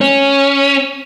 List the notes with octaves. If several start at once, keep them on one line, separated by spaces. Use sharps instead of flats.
C#4